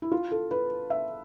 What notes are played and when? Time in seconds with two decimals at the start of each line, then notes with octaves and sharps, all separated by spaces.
0.02 E4
0.12 F4
0.32 A4
0.51 B4
0.90 E5